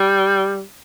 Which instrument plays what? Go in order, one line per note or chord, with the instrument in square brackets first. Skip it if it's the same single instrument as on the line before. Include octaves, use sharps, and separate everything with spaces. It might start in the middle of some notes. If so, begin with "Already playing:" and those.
Already playing: [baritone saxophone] G3